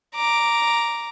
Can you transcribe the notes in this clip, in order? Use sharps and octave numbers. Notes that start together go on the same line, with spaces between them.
A#5 D6